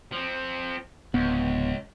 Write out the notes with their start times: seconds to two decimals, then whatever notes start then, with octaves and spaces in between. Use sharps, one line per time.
0.12 F3 C4
1.14 D1 C#2 B3